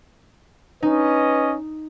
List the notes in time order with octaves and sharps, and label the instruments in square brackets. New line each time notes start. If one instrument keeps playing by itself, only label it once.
[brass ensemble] C#4 B4 D#5 [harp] D#4